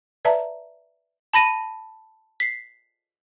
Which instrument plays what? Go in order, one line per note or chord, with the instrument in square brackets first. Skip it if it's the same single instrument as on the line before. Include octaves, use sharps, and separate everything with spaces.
[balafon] B4 D5 E5 A5 A#5
[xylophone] A5 B5 A#6 D#7
B6 C7